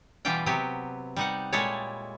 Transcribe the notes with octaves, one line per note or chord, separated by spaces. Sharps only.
B2 E3 G3 F4 G4 G5
C3 F#3 B3 G4
G3 D#4 F#5
A#2 G3 G#3 E4 A4 C#5